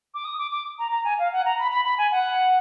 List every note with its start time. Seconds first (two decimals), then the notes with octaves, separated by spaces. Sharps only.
0.14 D6
0.25 D#6
0.38 D6
0.51 D6
0.79 A#5
0.92 A#5
1.05 G#5
1.19 F5
1.32 F#5
1.45 A#5
1.59 B5
1.72 B5
1.85 B5
1.98 G#5
2.11 F#5